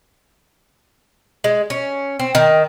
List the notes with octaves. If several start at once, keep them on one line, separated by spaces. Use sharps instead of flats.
G#3
C#4
C4
D#3